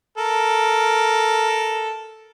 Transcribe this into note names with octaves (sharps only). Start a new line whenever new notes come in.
A4 A#4